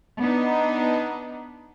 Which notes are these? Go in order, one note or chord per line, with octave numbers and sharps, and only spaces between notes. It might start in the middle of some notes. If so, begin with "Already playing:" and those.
B3 D4 D#4